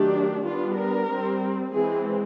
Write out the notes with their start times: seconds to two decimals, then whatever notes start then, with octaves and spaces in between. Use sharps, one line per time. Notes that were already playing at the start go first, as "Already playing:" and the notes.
Already playing: D#3 F#3 A3 D4 G4
0.45 G3 B3 D4 F4
0.77 A#4
1.10 G3 C4
1.73 E3 G#3 C4 G#4